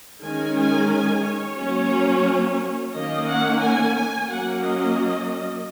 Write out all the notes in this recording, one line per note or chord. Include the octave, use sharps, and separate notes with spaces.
D#3 G#3 C#4 G#5
G#5
G#5
C#5
F#3 A#3 C#4
D#3 A#3 C#4 D#5
F#5
G#5
G#5
F#3 A#3 C#4 F#5
D#5